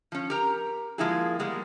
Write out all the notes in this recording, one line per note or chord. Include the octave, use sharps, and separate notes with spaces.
F3 C#4
G4 A#4 A#5
F3 G#3 A#3 E4 G4 G#4
G3 G#3 A#3 B3